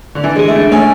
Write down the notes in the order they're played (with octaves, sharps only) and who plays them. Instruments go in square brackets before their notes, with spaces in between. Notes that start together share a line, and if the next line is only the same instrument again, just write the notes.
[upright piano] D3
[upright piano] E3 [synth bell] D4
[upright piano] G#3
[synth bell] G#4
[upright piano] A3
[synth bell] D4
[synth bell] A3 [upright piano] C#4